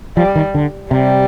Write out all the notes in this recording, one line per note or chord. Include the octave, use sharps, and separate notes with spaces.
F3 G3
D#3
D3
C3 G3